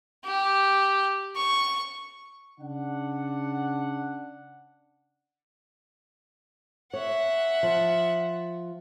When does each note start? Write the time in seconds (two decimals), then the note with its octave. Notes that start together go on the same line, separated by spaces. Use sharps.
0.24 G4
1.36 C#6
2.60 C#3 D4 F#5
6.93 C#5 E5 F#5
7.63 F3